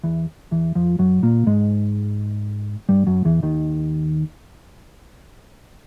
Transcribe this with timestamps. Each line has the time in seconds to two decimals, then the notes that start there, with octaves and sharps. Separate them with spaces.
0.04 E2 E3
0.51 E2 E3
0.75 F2 F3
0.99 F#2 F#3
1.23 A#2 A#3
1.46 G#2 G#3
2.89 G2 G3
3.07 F#2 F#3
3.25 E2 E3
3.43 D#2 D#3